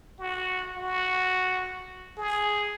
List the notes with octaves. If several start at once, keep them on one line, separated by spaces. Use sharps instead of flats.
F#4
F#4
G#4